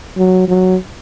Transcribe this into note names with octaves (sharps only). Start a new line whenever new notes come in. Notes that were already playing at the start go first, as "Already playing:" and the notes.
F#3
F#3